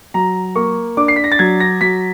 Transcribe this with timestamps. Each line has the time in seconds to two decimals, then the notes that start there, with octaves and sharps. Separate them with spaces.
0.14 F#3 A#5
0.55 A#3 C#6
0.97 D4 D6
1.08 C7
1.16 B6
1.24 A#6
1.32 A6
1.39 F#3 G#6
1.60 A#6
1.81 F#3 B6